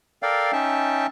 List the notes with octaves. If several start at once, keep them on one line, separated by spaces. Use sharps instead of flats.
A4 A#4 D5 F5 G5
C#4 D#4 E5 G5 A5